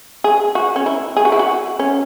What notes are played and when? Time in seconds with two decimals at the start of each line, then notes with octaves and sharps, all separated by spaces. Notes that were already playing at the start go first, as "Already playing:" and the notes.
0.24 G#4
0.55 F#4
0.76 C#4
0.86 E4
1.17 G#4
1.25 F#4
1.32 E4
1.39 F#4
1.79 C#4